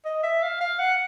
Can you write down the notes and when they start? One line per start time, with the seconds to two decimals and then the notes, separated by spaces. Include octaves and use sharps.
0.05 D#5
0.23 E5
0.42 F5
0.61 F5
0.79 F#5